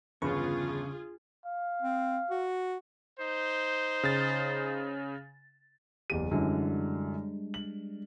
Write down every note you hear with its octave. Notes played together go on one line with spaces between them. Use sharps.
G1 E2 C#3 F4 G#4 B4 C#6
F5
C4
F#4
D#4 C5
C#3 A6
F#1 E2 G4 D#7
F#2 D3 E3 G3 G#3 D4
F#7